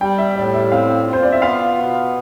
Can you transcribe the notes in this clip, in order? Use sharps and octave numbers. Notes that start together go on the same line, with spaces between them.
G3 G5
E5
A2 D5
E5
C4 F5
F4
C5
D5
E5
B3 F5
B2